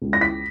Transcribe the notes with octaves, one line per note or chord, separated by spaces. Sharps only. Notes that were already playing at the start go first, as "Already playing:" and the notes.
C#2
A#6
B6